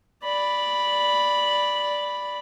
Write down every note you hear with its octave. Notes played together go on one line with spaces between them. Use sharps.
D5 B5